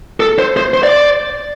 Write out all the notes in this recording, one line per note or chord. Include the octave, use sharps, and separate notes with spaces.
A4
C5
C5
C5
D5